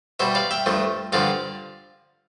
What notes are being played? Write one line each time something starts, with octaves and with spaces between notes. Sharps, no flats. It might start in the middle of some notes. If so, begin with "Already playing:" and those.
B2 G3 C5 E5
D5 F5
E5 G5
G2 F3 A3
G2 D3 F3 D5 F5